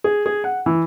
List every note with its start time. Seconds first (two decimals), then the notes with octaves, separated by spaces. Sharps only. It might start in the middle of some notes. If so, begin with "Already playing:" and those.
0.04 G#4
0.26 G#4
0.44 F#5
0.66 E3